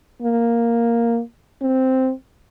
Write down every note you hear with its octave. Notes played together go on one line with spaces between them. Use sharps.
A#3
C4